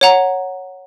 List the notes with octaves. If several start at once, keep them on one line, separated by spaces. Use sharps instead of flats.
C#5 F#5 A#5